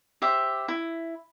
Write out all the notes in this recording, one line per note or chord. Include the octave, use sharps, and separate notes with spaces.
G4 C5 E5 D6
E4